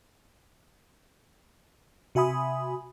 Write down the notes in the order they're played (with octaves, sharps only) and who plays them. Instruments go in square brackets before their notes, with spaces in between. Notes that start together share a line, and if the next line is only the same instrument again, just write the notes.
[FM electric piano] C3 F#4 E5 G#5 B5 D#6